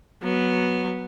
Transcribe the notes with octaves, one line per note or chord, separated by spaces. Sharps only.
F#3 B3